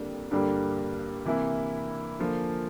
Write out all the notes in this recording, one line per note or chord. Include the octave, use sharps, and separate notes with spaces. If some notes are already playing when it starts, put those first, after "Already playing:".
Already playing: F2 D3 G3 A#3 D4
G2 D3 G3 A#3
C3 E3 A#3 E4
D3 F3 A#3 F4